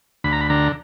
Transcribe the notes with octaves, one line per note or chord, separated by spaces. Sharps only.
D2 B5
A#5
B5
D3 A#5